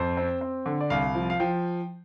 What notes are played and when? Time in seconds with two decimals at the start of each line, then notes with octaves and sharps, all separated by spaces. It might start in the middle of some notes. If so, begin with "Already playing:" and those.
Already playing: F2 C5
0.17 C4
0.41 C4
0.66 D3
0.81 D5
0.90 C2 F5
1.15 F3
1.30 F5
1.40 F3 G5